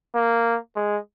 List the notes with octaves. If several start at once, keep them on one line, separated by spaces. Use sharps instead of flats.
A#3
G#3